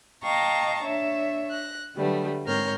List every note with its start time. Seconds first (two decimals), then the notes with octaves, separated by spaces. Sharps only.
0.23 D#5 F5 G5 A5 A#5 C#6
0.84 D4 C#5 E5
1.50 F#6 A#6
1.96 D3 F#3 G3 A3 B3
2.46 G#2 C4 A#4 C#5 F6 G6